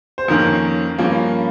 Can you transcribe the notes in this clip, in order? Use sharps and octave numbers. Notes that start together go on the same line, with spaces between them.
C5
F2 D#3 A#3 C#4 A#4
G2 F3 A#3 C#4